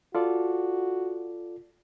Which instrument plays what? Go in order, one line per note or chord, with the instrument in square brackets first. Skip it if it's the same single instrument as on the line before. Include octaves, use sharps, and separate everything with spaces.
[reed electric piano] F4 A4 D5 [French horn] F#4